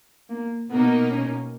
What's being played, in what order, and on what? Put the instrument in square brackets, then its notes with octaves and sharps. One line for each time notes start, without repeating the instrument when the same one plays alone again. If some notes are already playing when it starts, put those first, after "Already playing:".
[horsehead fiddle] A#3
[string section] B2 A#3 D#4 [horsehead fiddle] B3
[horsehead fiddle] C#4